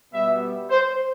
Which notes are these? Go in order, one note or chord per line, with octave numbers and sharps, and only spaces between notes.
B2 G3 B3 E5
C5